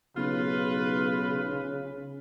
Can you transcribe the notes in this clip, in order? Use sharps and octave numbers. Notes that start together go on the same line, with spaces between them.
B1 C#3 F4 B4